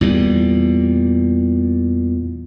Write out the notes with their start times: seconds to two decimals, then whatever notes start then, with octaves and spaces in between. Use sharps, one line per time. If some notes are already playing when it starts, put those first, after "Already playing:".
0.01 E2 A#2 G3